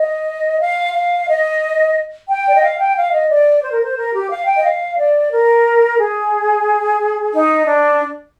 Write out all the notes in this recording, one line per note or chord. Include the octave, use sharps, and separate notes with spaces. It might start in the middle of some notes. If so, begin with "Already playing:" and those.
Already playing: D#5
F5
F5
D#5
G5
D5
D#5
F5
G5
F5
D#5
D5
C5
A#4
C5
A#4
G4
F5
G5
D#5
F5
D5
A#4
G#4
D#4
D4